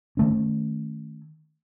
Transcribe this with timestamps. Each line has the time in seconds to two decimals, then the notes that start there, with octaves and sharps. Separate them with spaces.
0.17 D#3 A3 C#4